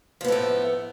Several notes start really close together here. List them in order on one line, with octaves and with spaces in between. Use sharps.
F3 B3 A2 A3